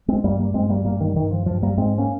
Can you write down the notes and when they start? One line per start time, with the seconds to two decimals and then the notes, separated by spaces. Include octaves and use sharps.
0.08 G#3 C4
0.24 G2 G3 A#3
0.39 G3 A#3
0.54 G2 G#3 C4
0.69 G3 A#3
0.85 G2 G3 A#3
1.01 D#3 G3
1.16 G2 D#3
1.31 F3
1.46 G2 F3
1.63 G3 A#3
1.77 G#2 G#3 C4
1.98 A#3 C#4